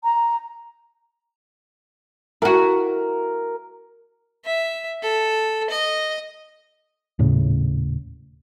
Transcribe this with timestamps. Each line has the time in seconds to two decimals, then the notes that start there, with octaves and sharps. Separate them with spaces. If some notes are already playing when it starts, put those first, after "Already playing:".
0.03 A#5
2.42 E4 F#4 A#4
4.45 E5
5.02 A4
5.70 D#5
7.19 D#1 A2 C#3